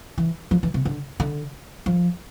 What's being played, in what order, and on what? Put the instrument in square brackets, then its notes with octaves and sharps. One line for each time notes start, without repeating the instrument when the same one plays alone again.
[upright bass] E3
F3
E3
C3
D3
D3
F3